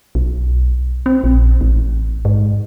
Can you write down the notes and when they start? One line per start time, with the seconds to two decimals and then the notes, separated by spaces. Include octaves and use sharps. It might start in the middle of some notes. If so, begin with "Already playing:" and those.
0.15 B1
1.06 C4
1.24 A#1
1.61 A1
2.25 G#2